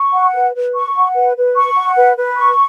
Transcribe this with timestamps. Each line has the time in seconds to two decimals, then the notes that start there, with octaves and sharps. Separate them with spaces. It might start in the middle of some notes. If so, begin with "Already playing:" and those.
Already playing: C#6
0.13 F#5
0.34 B4
0.55 B4
0.74 C#6
0.95 F#5
1.15 B4
1.36 B4
1.57 C#6
1.76 F#5
1.96 B4
2.17 B4
2.37 C#6